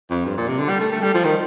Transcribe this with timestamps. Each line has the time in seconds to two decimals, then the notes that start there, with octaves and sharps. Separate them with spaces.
0.10 F2
0.26 G2
0.37 A#2
0.48 C3
0.59 D3
0.69 G3
0.81 A3
0.92 A3
1.02 G3
1.14 F3
1.24 D#3